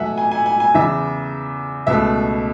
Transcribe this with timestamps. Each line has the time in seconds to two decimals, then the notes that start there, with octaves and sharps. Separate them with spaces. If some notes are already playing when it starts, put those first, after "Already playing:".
Already playing: E2 B2 F#3 A3 E5 F#5 G#5
0.18 G#5
0.31 G#5
0.46 G#5
0.60 G#5
0.74 E2 C#3 E3 E5
1.87 C#2 B2 A3 E5